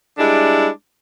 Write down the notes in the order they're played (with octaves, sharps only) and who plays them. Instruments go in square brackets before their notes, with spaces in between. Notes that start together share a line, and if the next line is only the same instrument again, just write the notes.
[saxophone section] G3 G#3 D4 E4